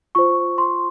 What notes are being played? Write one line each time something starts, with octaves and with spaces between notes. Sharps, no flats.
F4 C5 C#6
C6